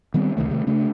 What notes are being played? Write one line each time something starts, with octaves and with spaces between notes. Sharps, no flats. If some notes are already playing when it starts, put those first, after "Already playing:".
D#3 G3 B3 C4
C#2 C3 D#3 A3
C3 D#3 F#3 A3
C#3 A3 D4